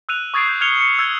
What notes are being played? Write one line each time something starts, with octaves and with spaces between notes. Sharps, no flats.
E6 F#6 D#7 F7
C#6 D#6 G#6 A6 C7 D7
G6 G#6
F6 G#6 C#7 F7 G7
C#7
E6 G#6 G7